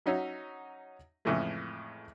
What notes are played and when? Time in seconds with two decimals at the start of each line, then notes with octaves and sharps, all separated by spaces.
0.06 F#3 C#4 D#4 F#4 C#5 E5
1.25 F2 A2 C#3 E3 G#3 A3